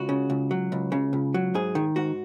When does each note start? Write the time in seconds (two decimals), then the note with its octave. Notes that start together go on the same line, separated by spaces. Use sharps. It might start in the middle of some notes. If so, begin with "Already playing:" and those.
Already playing: C#2 F#4
0.09 C#3
0.30 C#2
0.51 F#3
0.72 C#2
0.92 C#3
1.13 C#2
1.34 F#3
1.54 G#2 G#4
1.75 D#3
1.96 G#2 F#4